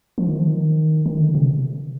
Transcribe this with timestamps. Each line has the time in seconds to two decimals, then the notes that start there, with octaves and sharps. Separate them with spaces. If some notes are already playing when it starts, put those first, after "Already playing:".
0.18 F3
0.27 D#3
0.38 F3
0.47 D#3
1.06 D#3
1.21 D3
1.35 C3